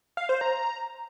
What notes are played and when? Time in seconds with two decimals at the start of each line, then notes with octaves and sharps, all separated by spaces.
0.17 F5
0.29 C5
0.41 A#5